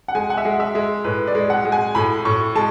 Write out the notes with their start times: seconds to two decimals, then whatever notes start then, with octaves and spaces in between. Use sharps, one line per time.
0.08 F#5
0.15 G#3 G#5
0.30 F#5
0.37 E5
0.45 G#3
0.60 E5
0.75 G#3
1.04 A2 B4
1.27 D5
1.35 G#3
1.50 F#5
1.65 G#3
1.72 G#5
1.95 A2 B5
2.25 A2 C#6
2.55 G#3 A5